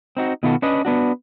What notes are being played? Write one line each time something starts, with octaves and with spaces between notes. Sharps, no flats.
C4 D#4 F#4
B2 D#3 B3 F4 F#4 A4
C#4 D4 B4 D#5
B3 D4 F#4